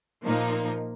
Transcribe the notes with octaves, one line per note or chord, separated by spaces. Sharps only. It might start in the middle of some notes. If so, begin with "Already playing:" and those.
A#2 F3 A#3 D#4